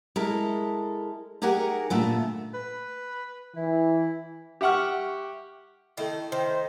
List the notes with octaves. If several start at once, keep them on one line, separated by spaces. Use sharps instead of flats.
G#3 E4 A4 A#4
D#4 G4 G#4 A#4 F#5 G#5
A#2 D3 A3 B3
B4
E3 E4
G4 E5 F#5 C#6 F6
D#3 A3 E4
D#3 C5